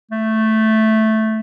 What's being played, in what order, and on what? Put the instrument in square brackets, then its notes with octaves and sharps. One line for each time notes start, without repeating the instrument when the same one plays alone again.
[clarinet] A3